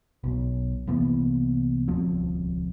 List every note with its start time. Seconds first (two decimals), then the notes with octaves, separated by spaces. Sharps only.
0.24 B1
0.87 C2 E3 A#3 B3
1.88 D#1 C#2 F3 C4